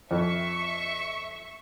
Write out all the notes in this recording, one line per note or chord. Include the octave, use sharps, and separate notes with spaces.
F2 E5 C#6